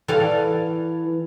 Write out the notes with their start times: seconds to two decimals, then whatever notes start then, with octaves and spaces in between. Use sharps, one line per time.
0.08 E3 A4 F5